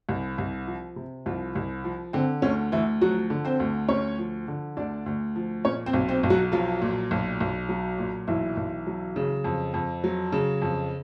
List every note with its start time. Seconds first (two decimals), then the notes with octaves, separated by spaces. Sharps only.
0.09 C2
0.38 C2
0.67 F3
0.96 C3
1.26 C2 F3 F4
1.55 C2
1.84 F3
2.13 D3 C4
2.42 D2 C#4
2.72 D2 E3 E4
3.01 F3 F#3 F#4
3.30 D3
3.45 C4 C5
3.60 D2
3.88 D2 C#4 C#5
4.18 F3
4.48 D3
4.77 D2 D4 D5
5.06 D2
5.36 F3
5.64 A#2 C#4 C#5
5.86 C4 C5
5.93 B1
6.09 C4 C5
6.23 B1
6.30 F#3 F#4
6.52 F3 F#3 F4
6.82 A#2
7.11 B1
7.40 B1
7.69 F#3
7.98 A#2
8.27 B1 E3 E4
8.57 B1
8.87 F#3
9.16 C#3
9.44 F2
9.74 F2
10.04 F#3
10.32 C#3
10.62 F2